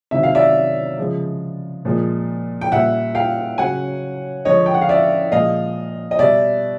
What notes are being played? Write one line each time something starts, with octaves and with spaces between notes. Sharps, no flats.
C3 D#3 F#3 E5
F5
D5 E5
C#3 F3 G#3
A#2 F3 G#3
G5
A#2 G3 E5 F#5
F5 G5
C#3 F#3 F#5 G#5
D3 F3 G#3 C#5 D#5
G5
F#5
F5
D5 E5
A#2 F3 G#3 D#5 F5
D#5
B2 G3 D5 E5